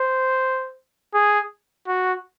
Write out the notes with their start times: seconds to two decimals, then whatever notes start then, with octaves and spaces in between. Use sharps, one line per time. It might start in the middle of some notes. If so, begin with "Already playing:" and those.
Already playing: C5
1.14 G#4
1.88 F#4